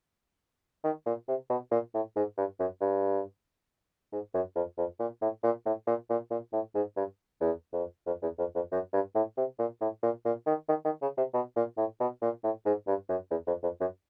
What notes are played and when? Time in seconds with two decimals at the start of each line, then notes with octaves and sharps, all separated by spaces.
0.84 D#3
1.06 A#2
1.28 C3
1.50 B2
1.71 A#2
1.94 A2
2.16 G#2
2.38 G2
2.59 F#2
2.81 G2
4.12 G#2
4.34 F#2
4.56 F2
4.78 F2
5.00 A#2
5.22 A2
5.44 A#2
5.66 A2
5.87 A#2
6.10 A#2
6.31 A#2
6.53 A2
6.75 G#2
6.97 G2
7.41 E2
7.73 F2
8.07 F2
8.22 E2
8.39 F2
8.55 F2
8.72 F#2
8.93 G2
9.15 A2
9.37 C3
9.59 A#2
9.81 A2
10.03 A#2
10.25 A#2
10.47 D#3
10.69 D#3
10.85 D#3
11.02 C#3
11.17 C3
11.34 B2
11.56 A#2
11.77 A2
12.00 B2
12.22 A#2
12.44 A2
12.66 G#2
12.87 G2
13.09 F#2
13.31 E2
13.47 F2
13.63 F2
13.81 F#2